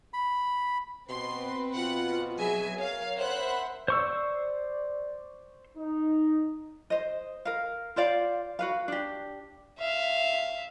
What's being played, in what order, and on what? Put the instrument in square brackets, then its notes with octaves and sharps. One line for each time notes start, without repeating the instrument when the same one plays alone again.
[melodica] B5
[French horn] B2 [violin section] C4 B4 [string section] C6
[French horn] B2 [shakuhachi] F4 [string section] F#5
[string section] F#3 E5 G#5 [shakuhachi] G#4
[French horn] A#4 [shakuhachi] C#5 [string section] F5
[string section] C5 F#6 [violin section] E5 F#5 B5
[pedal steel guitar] C5 C#6 E6 [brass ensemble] D5
[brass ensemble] D#4
[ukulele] C5 D#5
A#4 F5
F4 C5 D5 F5
F#4 B4 F5
D4 G4
[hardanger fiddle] E5 F5